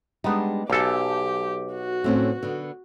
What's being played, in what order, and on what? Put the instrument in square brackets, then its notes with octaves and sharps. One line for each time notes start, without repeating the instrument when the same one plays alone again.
[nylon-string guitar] G3 G#3 D4 [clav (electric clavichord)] B3 D#4
[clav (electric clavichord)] B1 A4 [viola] G4 [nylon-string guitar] F5 G#5
[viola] F#4
[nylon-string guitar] A2 C4 C#4
D3 B3